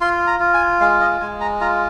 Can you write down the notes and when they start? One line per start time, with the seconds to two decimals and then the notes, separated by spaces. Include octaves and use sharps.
0.01 F4 C6
0.27 A#5
0.40 F4
0.54 G#5
0.80 G#3 F5
1.00 D#5
1.21 G#3 G#5
1.41 A#5
1.61 F4 A#5